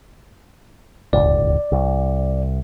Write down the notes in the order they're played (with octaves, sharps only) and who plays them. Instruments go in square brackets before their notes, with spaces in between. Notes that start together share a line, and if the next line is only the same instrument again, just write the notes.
[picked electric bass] D1 G1 C#2 [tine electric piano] D5
[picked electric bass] C2